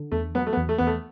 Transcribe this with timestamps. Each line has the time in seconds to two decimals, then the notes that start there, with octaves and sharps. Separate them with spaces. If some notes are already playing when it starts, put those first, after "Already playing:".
Already playing: D3
0.12 E2 A3
0.35 F#3 B3
0.47 A3
0.53 B3
0.57 E2
0.69 A3
0.78 E2 B3
0.87 A3